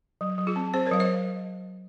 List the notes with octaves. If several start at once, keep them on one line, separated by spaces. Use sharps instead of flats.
F#3
F#3
F4 G#4
C4
C4 G#4 C5
A#4 C#5
F#3 F5
C5 D#5